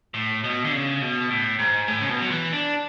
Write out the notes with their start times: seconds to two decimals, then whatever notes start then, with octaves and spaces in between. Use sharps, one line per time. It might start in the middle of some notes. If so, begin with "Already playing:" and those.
0.14 A2
0.44 B2
0.65 D3
0.73 C#3
1.02 B2
1.29 A2
1.59 G#2
1.88 A2
2.01 C#3
2.09 B2
2.21 F#3
2.31 E3
2.53 D4